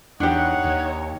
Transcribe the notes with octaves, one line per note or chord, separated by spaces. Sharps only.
E2 D4 D#4 G4 C#5 F#5
D#2